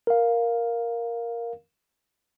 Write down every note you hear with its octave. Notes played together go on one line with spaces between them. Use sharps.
A#4 F5